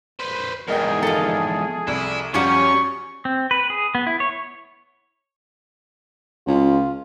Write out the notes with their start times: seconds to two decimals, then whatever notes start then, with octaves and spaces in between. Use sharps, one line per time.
0.20 B4 C5
0.68 E2 G#2 G#4 A#4 D#5 G5
1.03 F3 A4
1.88 C2 E4
2.34 F#2 F3 G3 C#4 G4 F#5 C#6
3.25 C4
3.51 B4
3.70 G#4
3.95 B3
4.07 E4
4.20 C#5
6.47 C#2 F4